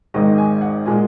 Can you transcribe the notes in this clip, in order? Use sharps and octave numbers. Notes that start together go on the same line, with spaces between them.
G#1 G#2 D#3 G#3 D#5
G#5
F#5
A#2 G#3 G#5